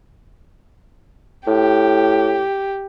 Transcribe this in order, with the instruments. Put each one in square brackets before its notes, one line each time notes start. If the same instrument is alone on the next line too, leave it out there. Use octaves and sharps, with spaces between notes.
[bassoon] A2 [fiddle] G4